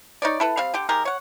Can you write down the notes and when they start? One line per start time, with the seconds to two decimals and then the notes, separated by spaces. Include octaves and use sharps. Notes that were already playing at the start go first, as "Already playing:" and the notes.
0.22 D#4 C#5 D5
0.40 E4 A4 B4
0.57 G3 C4 F5
0.74 D3 G4
0.89 G#3 D#4 G4 A#4
1.05 C#5 F#5